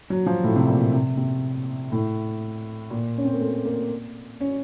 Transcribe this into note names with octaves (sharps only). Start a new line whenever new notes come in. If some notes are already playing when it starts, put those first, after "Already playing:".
F#3
F3
A2
C3
A#2
C3
C3
A2
A#2
C#4
C4
A#3
A3
A#3
C#4